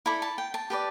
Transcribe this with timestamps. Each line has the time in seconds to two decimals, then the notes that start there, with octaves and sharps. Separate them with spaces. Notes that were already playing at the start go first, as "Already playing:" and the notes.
0.06 E4 A4 D5 B5
0.22 A5
0.38 G5
0.54 A5
0.70 G4 B4 D5